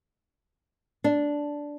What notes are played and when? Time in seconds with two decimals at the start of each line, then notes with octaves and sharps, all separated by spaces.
1.04 D4